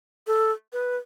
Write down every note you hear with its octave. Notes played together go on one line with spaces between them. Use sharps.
A4
B4